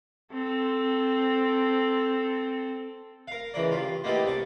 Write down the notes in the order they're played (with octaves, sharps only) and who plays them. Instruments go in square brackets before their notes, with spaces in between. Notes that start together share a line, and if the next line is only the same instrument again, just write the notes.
[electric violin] C4 A4
[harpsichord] A#4 F5
C#2 E3 A#4 D5
G2 F4
A#3 B3 D#4 E4 G4 A4
C2 D5 C#6